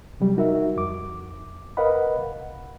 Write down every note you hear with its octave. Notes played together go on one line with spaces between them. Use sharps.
C3 F#3 G3
D#4 F#4 A#4 E5
F2 D6
A#4 B4 D#5 F5 F#5 B5
C2